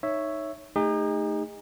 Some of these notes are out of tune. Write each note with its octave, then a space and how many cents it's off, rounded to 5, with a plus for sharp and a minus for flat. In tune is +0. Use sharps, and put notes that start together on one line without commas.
D#4 -5 C#5 +0 E5 +0
A3 +0 D#4 +0 G#4 -45